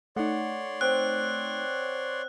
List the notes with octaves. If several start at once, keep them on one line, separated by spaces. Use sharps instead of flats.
A3 D#4 C#5 D5 F#5 C6
C4 F#6